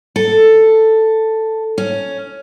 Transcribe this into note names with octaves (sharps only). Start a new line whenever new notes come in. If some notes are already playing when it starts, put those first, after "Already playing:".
A4
C#4